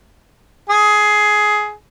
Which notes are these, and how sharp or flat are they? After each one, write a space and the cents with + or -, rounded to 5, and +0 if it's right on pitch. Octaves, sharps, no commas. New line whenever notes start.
G#4 +15